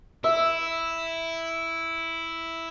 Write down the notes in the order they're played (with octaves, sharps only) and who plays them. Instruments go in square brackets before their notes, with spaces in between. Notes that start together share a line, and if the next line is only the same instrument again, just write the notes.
[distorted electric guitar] E4 [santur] E5